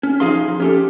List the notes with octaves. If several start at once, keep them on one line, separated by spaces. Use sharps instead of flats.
C#4
F3 D#4 G#4 F5 C6
C#4 G4 A4